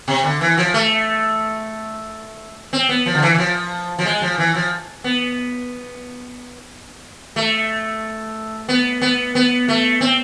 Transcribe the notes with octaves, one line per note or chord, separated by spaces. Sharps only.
C3
D3
E3
F3
A3
C4
B3
F3
D3
E3
E3
F3
F3
G#3
F3
E3
F3
B3
A3
B3
B3
B3
A3
C4